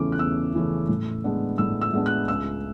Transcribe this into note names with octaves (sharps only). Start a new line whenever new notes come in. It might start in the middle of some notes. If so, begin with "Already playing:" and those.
Already playing: E2 C#3 E3 A3 C#4 D6
F#6
E2 E6
C#3 E3 A3 C#4
A2
G#3 B3 D4
A2 E6
E6
G#3 B3 D4
F#6
C#2 E6